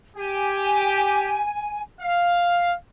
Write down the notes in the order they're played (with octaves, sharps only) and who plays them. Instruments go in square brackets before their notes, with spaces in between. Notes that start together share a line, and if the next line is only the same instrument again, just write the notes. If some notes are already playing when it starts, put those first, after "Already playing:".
[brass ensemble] G4 [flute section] G#5
[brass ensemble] F5